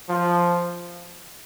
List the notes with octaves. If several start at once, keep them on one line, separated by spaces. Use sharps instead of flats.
F3